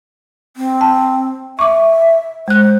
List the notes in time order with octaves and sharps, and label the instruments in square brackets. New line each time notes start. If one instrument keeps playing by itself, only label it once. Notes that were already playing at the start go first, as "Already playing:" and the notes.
[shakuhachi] C4
[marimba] A5
[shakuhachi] E5 [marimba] C#6 D6
[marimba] G#3 F#6 [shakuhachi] C5